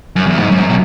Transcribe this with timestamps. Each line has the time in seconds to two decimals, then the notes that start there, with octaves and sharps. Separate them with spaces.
0.16 F#2
0.26 E2
0.38 G#2
0.50 F#2
0.70 B2